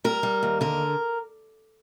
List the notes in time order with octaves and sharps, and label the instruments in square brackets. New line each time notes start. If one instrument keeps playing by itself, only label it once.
[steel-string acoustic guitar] G3 A#4
G3
D#2
D3 A#4